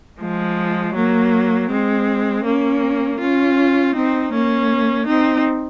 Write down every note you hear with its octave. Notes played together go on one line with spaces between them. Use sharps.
F3 G#3
F#3 A#3
G#3 C4
A#3 C#4
C#4 F4
C4 D#4
A#3 C#4
C4 D#4